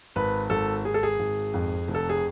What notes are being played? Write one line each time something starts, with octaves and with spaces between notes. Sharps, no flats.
G#1 B4
G#1 A4
G#1 G#4
A4
G#4
G#1
F2
F1
A4
G#4